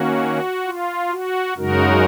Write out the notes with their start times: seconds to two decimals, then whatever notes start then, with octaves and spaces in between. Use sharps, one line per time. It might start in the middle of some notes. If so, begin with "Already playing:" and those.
Already playing: D#3 A#3 C#4 F#4
0.65 F4
1.11 F#4
1.57 F#2 C#3 G#3 D#4 F#4 A#4